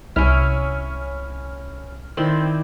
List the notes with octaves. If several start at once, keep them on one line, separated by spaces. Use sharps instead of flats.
C2 C#4 E4 F6
D#3 C4 E4 D5